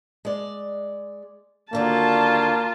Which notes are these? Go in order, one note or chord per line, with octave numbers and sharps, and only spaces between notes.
G#3 D5
D#2 D3 A#3 F4 F#4 A5